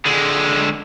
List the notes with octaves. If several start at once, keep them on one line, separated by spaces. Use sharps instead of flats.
D3 G#3